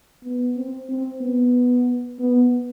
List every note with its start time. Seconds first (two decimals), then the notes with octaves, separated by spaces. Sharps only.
0.24 B3
0.56 C4
0.89 C4
1.21 B3
2.19 B3